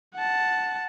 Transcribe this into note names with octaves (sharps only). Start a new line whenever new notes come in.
F#5 A5